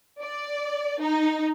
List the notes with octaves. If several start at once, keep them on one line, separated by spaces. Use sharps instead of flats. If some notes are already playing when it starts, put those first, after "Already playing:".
D5
D#4